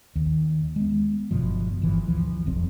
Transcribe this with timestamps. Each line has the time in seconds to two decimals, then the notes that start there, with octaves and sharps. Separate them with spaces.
0.16 D#2
0.76 G#3 B3
1.31 G1 F#2 B2 F3
1.82 G1 E3 F3
2.08 D2 E3 F3
2.46 E1 B1 F2 C4